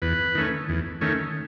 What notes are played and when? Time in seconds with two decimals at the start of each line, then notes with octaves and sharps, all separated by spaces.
0.02 E2 B4
0.35 D#3 A3 C#4
0.69 E2
1.01 D#3 A3 C#4